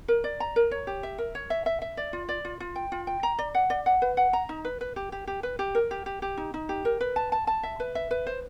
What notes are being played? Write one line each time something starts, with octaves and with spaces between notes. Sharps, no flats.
A#4
D5
A#5
A#4
C#5
G4
E5
A#4
C#5
E5
E5
E5
D5
F4
D5
F4
F4
G5
F4
G5
A#5
D5
F#5
D5
F#5
B4
F#5
A#5
D#4
B4
B4
G4
G4
G4
B4
G4
A#4
G4
G4
G4
D#4
D#4
G4
A#4
B4
A5
A5
A5
E5
B4
E5
B4
C5